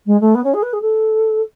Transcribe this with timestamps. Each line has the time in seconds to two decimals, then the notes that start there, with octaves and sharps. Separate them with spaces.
0.06 G#3
0.21 A3
0.35 B3
0.44 C#4
0.54 G#4
0.62 B4
0.73 G#4
0.81 A4